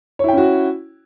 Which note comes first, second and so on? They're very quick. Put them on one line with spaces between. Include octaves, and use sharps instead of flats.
C#5 E4 G5 C#4 F#4